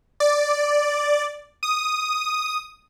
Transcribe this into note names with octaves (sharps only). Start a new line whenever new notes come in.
D5
D#6